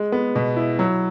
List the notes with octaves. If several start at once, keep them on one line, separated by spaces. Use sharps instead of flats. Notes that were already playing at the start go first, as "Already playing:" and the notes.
Already playing: G#3
B3
B2
E4
F#3